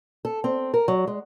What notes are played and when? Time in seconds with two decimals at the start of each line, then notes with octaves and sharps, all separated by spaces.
0.25 A4
0.44 C4
0.74 A#4
0.88 F#3
1.07 G#3